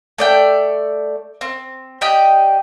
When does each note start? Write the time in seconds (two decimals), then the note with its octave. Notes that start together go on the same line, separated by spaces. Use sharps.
0.18 A3 D5 G5
1.41 C4
2.01 G4 D5 D#5 G5